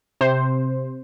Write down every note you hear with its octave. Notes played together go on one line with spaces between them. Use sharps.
C3 C5